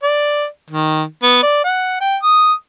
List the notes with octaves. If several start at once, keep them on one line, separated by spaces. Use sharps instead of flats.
D5
D#3
B3
D5
F#5
G5
D#6